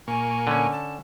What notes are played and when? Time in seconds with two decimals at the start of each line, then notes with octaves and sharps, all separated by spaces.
0.08 A#2 A#3 G#5 C#6
0.47 D3 C#4
0.72 A5